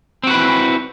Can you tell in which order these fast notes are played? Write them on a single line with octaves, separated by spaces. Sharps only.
C4 F#4 B4 E4